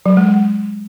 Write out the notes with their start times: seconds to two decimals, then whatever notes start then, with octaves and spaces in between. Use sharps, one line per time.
0.06 F#3
0.17 G#3
0.29 G#3